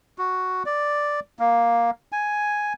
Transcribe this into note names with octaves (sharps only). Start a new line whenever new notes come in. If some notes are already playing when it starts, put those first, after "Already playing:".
F#4
D5
A#3
G#5